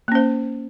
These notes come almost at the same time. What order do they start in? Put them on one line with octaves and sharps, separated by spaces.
A#3 C#4 C5